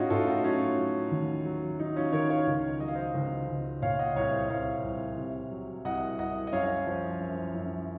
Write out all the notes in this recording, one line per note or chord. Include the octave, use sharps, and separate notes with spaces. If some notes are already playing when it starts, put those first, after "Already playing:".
Already playing: A2 C#4 D#4 F4 F#4
A2 F4 A4
D#4 F#4
F#3 C#4 F4
F#3
D#2
F#3
F#3 D#4
C#4 F4
D#3 A#4 C#5
C#5 F5
C#2
F#3 D#5
F5
C5 D#5
C#2
C#2
A#2 C#5 F5
D#5 F#5
C2 C#5 F5
C5 D#5
C2 C#5 F5
C2
C3
F#3
C2 D#5 F#5
C2 D#5 F#5
D#5
F#2 C#5 F5
F3
F#2
F#2